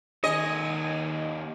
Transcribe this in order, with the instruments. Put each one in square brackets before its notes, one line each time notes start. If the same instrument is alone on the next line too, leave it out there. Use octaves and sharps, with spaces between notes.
[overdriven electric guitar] D#2 G#5 [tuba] D#3 [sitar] D#5